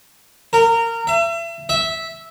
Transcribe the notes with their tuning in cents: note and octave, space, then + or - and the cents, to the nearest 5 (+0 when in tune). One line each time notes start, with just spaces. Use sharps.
A#4 -20
E5 +35
E5 -10